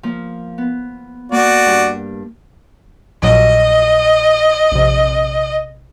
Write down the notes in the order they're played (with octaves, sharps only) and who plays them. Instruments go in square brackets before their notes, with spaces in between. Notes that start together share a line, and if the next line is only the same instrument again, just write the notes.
[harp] F3 A#3
B3
[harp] A#3 [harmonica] F#4 D5
[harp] G2 G4
[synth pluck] A#1 A#2 F#3 [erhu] D#5
[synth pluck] A#1 C3